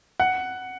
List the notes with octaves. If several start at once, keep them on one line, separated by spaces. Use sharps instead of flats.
F#5